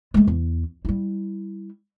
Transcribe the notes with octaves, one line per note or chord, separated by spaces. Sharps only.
G#3 A3
E2
G3 E4